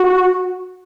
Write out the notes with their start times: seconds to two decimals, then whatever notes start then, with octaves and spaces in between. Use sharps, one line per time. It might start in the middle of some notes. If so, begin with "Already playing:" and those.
Already playing: F#4